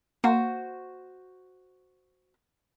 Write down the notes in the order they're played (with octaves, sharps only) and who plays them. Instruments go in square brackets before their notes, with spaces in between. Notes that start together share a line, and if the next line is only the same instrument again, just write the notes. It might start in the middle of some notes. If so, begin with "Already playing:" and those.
[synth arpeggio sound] A#3 [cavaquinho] F#4 C5